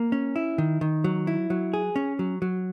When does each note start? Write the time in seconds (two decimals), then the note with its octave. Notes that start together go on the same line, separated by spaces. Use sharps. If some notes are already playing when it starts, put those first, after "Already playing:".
Already playing: A#3
0.12 C#4
0.36 E4
0.58 D#3
0.81 D#3
1.04 F#3
1.27 E4
1.50 F#3
1.74 G#4
1.96 C#4
2.19 F#3
2.42 F#3